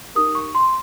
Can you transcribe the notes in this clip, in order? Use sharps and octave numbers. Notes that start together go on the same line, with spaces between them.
D#4 G4 A#4 D#6
C#6
C6